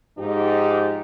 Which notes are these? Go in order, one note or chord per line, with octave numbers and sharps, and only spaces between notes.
G#2 F3 D#4 G4